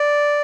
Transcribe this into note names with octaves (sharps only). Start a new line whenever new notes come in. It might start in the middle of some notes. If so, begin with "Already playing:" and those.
Already playing: D5